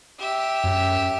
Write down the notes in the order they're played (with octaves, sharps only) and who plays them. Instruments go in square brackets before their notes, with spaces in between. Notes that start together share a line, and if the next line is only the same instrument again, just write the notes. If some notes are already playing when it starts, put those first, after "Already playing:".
[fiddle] G4 E5
[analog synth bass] F#2